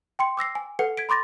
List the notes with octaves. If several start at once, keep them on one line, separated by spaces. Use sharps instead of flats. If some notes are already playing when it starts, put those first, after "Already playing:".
G5 C6 C#7
D6 E6 A#6 C7
G#5
A4 B4 F#5 C#7
G#6 B6 D7
B5 C6 D6 A6 A#6